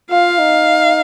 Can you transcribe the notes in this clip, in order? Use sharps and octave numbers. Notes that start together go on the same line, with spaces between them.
F4 F5
D#4